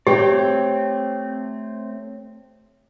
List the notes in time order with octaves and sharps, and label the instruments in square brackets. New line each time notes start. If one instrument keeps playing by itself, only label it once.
[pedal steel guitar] A3 C4 D5 [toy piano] G4 [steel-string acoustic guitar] C#5 G5